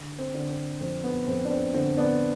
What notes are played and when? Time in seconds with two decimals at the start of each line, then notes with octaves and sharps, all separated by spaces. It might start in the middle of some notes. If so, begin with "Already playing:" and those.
Already playing: D3
0.19 C4
0.34 D3
0.50 C4
0.81 F2 C4
1.04 B3
1.27 F2 C4
1.45 D4
1.50 C4
1.74 D3 C4
1.97 B3 D4